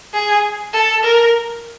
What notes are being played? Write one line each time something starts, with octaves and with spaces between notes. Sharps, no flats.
G#4
A4
A#4